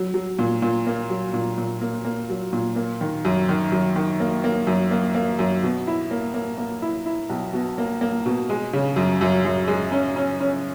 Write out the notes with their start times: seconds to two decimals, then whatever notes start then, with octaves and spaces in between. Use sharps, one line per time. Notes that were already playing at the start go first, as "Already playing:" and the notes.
Already playing: F#3
0.14 F#3
0.39 A#2
0.62 A#2
0.87 A#3
1.10 F#3
1.34 A#2
1.58 A#2
1.81 A#3
2.05 A#3
2.30 F#3
2.53 A#2
2.76 A#3
3.01 D#3
3.25 F#2
3.49 D#3
3.72 F#2
3.96 D#3
4.20 A#3
4.44 A#3
4.67 F#2
4.91 A#3
5.15 A#3
5.39 F#2
5.63 B2
5.87 E4
6.11 A#3
6.34 A#3
6.58 A#3
6.82 E4
7.06 E4
7.30 B1
7.53 B2
7.78 A#3
8.01 A#3
8.26 B2
8.50 G#3
8.73 C#3
8.96 F#2
9.21 F#2
9.45 F#2
9.68 G#3
9.92 C#4
10.16 C#4
10.40 C#4